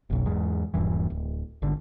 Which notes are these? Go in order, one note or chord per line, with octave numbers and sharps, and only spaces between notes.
F#1 B1
E2 G#2
D#1 G2 E3
D1
G#1 D3